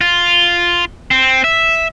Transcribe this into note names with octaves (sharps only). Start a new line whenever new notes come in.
F4
C4
E5